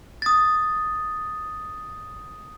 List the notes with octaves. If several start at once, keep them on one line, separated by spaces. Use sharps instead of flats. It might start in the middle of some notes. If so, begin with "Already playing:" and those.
D#6 A6